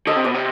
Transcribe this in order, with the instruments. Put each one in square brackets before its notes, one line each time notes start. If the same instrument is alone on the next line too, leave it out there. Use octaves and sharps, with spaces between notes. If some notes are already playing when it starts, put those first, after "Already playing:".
[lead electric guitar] D3 [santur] D#5
[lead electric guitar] C3
[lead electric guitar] B2 [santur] D5
[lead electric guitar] C3